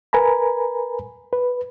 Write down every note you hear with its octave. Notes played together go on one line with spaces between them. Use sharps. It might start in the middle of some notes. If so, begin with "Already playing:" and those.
A#4 B4 G#5 A#5 B5
B4